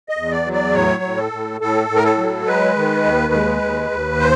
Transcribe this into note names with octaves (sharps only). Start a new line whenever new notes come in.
D#5
E2
D5
F#3
D5
A2 C#5
A2
A4
A2
A2 A4
A2
A#4
A4
F#3
G#3 B4
D#3
D#2
G#3
D#2
D#2
C5